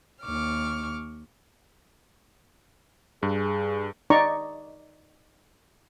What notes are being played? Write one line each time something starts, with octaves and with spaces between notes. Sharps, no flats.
D#2 C#6 D6 F6
G2 G#4
D#4 D5 A#5 C#6